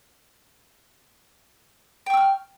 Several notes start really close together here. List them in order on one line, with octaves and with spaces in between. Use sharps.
G5 C#6 E6 F6